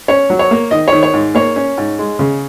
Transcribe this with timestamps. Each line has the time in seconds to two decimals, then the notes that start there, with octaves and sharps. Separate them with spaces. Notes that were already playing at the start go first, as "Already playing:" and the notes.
0.08 C#4 C#5
0.30 F#3
0.39 C#5
0.51 A#3
0.71 D#3 D#5
0.88 D#3 C#5
1.03 C#5
1.14 G#2
1.35 A#3 C#5
1.56 C#4
1.77 G#2
1.99 G#3
2.19 C#3